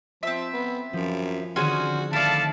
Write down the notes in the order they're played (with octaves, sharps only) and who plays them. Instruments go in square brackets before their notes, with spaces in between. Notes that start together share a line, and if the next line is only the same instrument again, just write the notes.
[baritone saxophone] F3 [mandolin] C4 E5
[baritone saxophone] B3
[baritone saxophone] F#2 [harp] F3
[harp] D3 D#3 C4 [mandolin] C#4 G#4 C5 [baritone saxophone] F#4
[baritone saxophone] A2 [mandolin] E4 D5 [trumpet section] A4 F5 A5